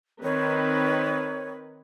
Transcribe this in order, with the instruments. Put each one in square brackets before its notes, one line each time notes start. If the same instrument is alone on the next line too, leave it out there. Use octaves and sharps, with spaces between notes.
[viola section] D#3 C4 B4 [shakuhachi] C#5